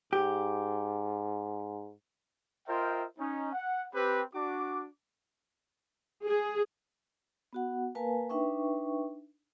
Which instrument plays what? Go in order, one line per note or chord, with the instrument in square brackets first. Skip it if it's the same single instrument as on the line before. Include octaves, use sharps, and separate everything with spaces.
[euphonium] G#2 [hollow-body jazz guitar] G4
[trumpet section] F4 A#4 C5 D#5 E5 G5
C#4 D#4
F#5
C4 G4 B4
D4 F#4 D6
[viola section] G#4
[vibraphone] B3 F#4 F#5
A#3 A#4 B4 F5 G#5 A5
D4 D#4 B4 E5 G5 C#6